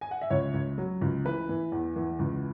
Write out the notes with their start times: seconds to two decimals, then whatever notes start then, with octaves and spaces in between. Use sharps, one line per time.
0.01 G#5
0.11 F#5
0.21 E5
0.30 C#2 C#5
0.54 C#2
0.78 F#3
1.02 C#2
1.25 E3 B4
1.49 E3
1.72 E2
1.96 E3
2.19 C#2